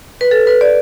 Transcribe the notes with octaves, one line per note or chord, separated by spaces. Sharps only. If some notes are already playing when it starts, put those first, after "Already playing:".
B4
A4
B4
D5